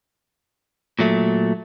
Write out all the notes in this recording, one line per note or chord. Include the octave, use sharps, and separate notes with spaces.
A#2 F#3 A3